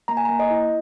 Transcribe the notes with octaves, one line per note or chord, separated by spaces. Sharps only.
A#3 A#5
G#5
A#3 A#5
D#5
E4